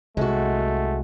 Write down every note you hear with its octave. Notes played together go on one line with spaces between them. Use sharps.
C2 G#3 A3 F#4